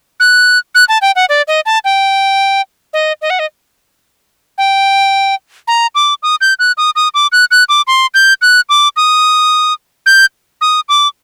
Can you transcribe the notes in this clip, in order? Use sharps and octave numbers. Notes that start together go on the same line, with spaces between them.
F#6
F#6
A5
G5
F#5
D5
D#5
A5
G5
D#5
D#5
F#5
D#5
G5
A#5
D6
D#6
G6
F#6
D#6
D#6
D6
F#6
F#6
D6
C6
G6
F#6
D6
D#6
G6
D#6
D6